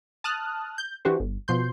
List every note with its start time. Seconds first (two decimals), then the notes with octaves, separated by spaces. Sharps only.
0.24 A5 D#6 F6 F#6
0.78 G6
1.05 E3 D4 F#4 G4 C5
1.20 G1
1.48 B2 F3 C6 G6